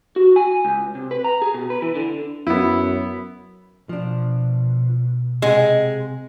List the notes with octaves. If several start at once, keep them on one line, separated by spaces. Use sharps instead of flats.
F#4
G#5
C#2
C3
B4
A#5
G#4
B2
B4
E3
D3
F#2 B3 E4
B2 F3 D4
C3 G#3 D#5 F#5